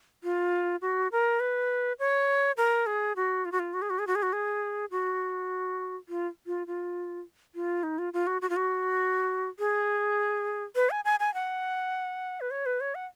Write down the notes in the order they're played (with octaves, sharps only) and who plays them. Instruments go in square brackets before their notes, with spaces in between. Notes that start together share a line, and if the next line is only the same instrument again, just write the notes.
[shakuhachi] F4
F#4
A#4
B4
C#5
A#4
G#4
F#4
F4
F#4
F4
F#4
G#4
F#4
G#4
F#4
G#4
F#4
G#4
F#4
F4
F4
F4
F4
D#4
F4
F4
F#4
F#4
F4
F#4
G#4
B4
G#5
G#5
G#5
F#5
B4
C#5
B4
C#5
F#5